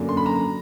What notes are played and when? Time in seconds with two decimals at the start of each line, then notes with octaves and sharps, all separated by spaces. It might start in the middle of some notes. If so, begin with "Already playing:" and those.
Already playing: F#2 D3 F#3 A#3
0.09 C6
0.17 B5
0.26 A#5